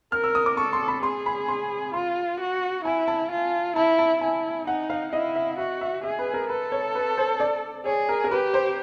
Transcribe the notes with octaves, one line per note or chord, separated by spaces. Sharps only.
A#4 F6
E6
D#6
D6
A4 C#6
C6
B5
G#4 C6
B5
C6
F4 C6
F#4
E4 G#5
A5
F4
E4 A5
A5
E4 G#5
D#4 F#5
F5
E4 D#5
E5
F#4 E5
E5
G#4 E5
B4
A#4
A4 B4
C#5
B4
C5
D5
G#4 C#5
A#4
A#4
G4 B4
C5